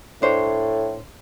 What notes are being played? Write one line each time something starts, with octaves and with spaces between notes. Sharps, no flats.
A2 D4 C5 C#5